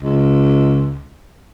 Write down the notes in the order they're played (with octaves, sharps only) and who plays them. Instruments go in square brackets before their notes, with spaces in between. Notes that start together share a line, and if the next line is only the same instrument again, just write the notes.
[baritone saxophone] C#2